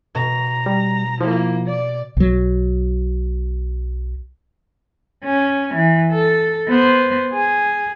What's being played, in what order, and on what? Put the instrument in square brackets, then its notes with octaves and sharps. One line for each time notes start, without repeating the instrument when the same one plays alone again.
[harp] B2 [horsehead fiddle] A#5
[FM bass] G3
[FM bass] F3 [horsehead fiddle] A#3 E4
[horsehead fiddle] D5
[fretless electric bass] B1 F#3
[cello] C#4
E3
A4
B3 C5
G#4